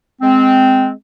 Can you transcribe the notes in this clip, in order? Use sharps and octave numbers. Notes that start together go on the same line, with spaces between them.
G#3 C4